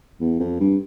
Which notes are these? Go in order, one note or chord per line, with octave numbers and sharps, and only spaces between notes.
E2
F2
G2